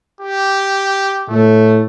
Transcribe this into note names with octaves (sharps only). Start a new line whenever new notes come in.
G4
A2 A3